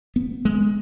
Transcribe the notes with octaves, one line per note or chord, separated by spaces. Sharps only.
B3
G#3